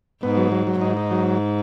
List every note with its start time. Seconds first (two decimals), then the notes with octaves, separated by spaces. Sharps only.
0.23 G#2 B3
0.37 F#3
0.52 F#3
0.67 F#3
0.81 G#2 D#4
0.97 D#4
1.11 F#3